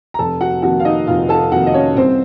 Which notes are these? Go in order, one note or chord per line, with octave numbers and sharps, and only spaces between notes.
A#5
F1 A4 A5
F#4 F#5
F2 D#3 A#3 F#4 F#5
F5
D#4 D#5
F1 F4 F5
A4 A5
F2 D#3 A#3 F#4 F#5
D#5
C#4 C#5
C2 C4 C5